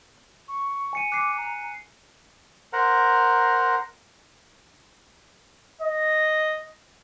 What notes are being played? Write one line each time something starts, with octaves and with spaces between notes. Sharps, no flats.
C#6
G#5 C#7 D#7
D6 F#6 C7
A#5
A#4 C5 F#5 A#5
D#5